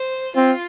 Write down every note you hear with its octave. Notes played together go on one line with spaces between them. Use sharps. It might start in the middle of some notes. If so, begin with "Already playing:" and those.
Already playing: C5
C4 F4